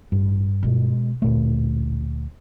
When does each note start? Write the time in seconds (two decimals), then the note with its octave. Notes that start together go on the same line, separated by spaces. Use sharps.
0.12 A1 G2
0.63 B2 G#3
1.22 A1 D2 A#2 A3